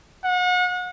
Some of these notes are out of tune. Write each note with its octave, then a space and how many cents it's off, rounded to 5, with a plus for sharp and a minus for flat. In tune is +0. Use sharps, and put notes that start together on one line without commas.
F#5 -35